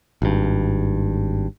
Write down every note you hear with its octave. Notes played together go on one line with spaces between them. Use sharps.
G#1 G2